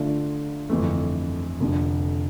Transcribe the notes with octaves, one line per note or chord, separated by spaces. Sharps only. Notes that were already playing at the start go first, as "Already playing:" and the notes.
Already playing: D2 D3 A3 D4 F4
G1 F2 E3 A3
F1 F2 D3